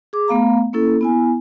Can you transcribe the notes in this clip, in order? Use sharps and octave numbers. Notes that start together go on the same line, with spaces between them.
G#4 D6
A3 B3 F5 A#5
A#3 C#4 E4 A4
B3 E4 G#5